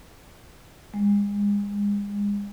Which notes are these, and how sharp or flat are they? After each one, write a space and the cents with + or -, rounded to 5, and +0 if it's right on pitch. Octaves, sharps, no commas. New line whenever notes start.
G#3 -35